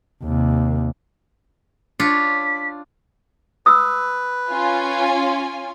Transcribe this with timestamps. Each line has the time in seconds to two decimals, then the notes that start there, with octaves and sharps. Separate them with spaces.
0.23 D#2 C3
2.00 D4 F4 C#5 B6
3.66 B4 D#6 E6
4.49 C#4 F4 G#5